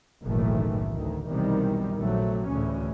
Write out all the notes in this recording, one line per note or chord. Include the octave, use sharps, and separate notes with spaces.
F#1 B1 A2 D#3 E3 A3
D2 D#3
B1 E2 C3 D#3 G3
A#1 C3 F#3 A3
D2 A2 C#3 E3 C#4